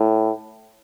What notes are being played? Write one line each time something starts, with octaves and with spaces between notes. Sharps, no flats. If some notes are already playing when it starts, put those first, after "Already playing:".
Already playing: A2